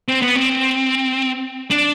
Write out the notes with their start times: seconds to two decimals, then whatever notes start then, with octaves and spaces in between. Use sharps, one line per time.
0.08 C4
0.22 B3
0.36 C4
1.71 D4